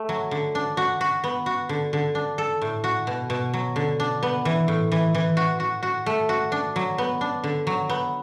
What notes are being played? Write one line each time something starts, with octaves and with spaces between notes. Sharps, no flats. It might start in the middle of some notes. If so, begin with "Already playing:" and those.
Already playing: A3
F#3
D3
D4
F#4
F#4
B3
F#4
D3
D3
D4
A4
A2
F#4
B2
B2
F#3
D3
D4
B3
E3
A2
E3
E3
F#4
F#4
F#4
A3
F#4
D4
F#3
B3
D4
D3
F#3
B3